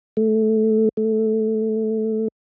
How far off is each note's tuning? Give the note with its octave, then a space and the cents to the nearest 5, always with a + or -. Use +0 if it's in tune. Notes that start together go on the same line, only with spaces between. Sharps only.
A3 -10
A3 -5